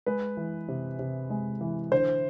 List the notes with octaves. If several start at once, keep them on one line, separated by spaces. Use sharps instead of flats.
G#3 B4
E3
C3
C3
G#3
E3
D3 C5